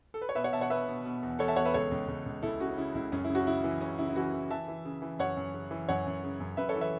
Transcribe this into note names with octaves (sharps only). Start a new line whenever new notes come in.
A4
B4
C#5
B2 B4 E5
C#5 F#5
B2 E5 A5
C#5 F#5
B2 B4 E5
B2
B2
E2
E2 A4 C#5
E5 A5
E2 C#5 F#5
B4 E5
C#2 A4 C#5
C#2
C#2
C#2
C#2 E4 A4
C#3 C#4 F#4
C#4
C#3 E4
C#2 E4
F#2 C#4
E4
C#3
C#4 F#4
C#3 E4
E3
C#3 C#4
C#3 E4
E4
E3 C#4 F#4
E3
E3 E5 A5
E3
C#3
E3
F#2 C#5 F#5
F#2
C#3
E3
F#2 C#5 F#5
F#2
C#3
F#2
F#2 B4 E5
A4 C#5
E3
B4 E5